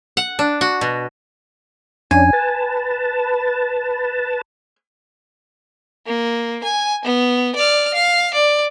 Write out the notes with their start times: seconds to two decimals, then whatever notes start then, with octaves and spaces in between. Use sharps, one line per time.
0.17 F#5
0.39 D4
0.61 F#4
0.81 B2
2.11 F2 C#4 D4 G#5
2.33 B4 A5
6.06 A#3
6.64 G#5
7.05 B3
7.55 D5 F6
7.94 F5
8.34 D5